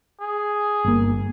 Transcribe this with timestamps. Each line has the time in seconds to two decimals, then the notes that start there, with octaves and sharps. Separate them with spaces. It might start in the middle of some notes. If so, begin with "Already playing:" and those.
0.21 G#4
0.84 G1 A#3